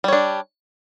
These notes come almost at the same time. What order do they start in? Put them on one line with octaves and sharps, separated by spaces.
G3 C#5 D4